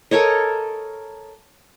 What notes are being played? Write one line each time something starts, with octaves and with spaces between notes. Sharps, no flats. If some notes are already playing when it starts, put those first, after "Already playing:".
A4 A#4 C#5 D#5